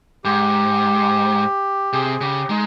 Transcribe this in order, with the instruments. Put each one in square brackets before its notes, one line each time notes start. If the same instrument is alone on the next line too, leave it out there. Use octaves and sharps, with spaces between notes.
[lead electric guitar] G#2 [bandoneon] G4
[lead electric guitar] C3 [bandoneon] G#4
[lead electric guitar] C#3 [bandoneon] G4
[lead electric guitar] G#3 [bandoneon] D#4